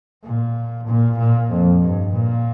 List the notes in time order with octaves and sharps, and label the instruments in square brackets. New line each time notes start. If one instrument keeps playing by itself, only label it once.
[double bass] A#2
A#2
A#2
F2
G2
A#2